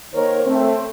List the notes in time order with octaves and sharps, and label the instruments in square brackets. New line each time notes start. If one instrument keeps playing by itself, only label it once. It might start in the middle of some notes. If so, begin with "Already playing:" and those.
[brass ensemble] D#3 A#3 A#4 C5 C#5
A3 C4